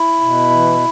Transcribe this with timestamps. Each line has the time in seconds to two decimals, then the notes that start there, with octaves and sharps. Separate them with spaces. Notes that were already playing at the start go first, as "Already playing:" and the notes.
Already playing: E4
0.21 B2
0.50 E3